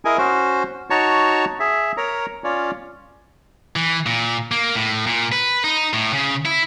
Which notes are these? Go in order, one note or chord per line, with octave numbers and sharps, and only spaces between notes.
E4 G#4 A#4 D#5 G#5
C#4 F#4 C5
D#4 F#4 C#5 A5 A#5 C#6
G#4 E5
A#4 C#5 A#5
C#4 F4 C#5 D5
E3
A#2
A#3
A2
A#2
B4
D#4
A2
C#3
E4